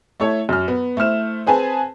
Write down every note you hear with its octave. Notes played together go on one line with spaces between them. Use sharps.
A3 E4 A4 C#5
F#2 F6
B3
A3 E4 C5 F6 E7
C4 G#4 B4 G#5 A5